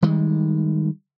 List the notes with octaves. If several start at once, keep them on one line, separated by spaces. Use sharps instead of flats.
D#3 G3 G#3